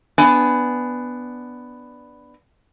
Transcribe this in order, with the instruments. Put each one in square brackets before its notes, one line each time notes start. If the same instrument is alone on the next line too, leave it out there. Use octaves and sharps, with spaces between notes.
[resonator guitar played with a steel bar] B3 D4 G#5